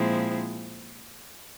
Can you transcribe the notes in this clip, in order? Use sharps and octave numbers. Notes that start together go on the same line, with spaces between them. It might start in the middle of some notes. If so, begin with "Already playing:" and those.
Already playing: A#2 F3 G#3 C4 E4